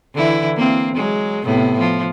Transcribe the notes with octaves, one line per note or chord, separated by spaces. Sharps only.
D3 E3 E4
A#3 C4
F#3 G#3
A2 C3 B3
F3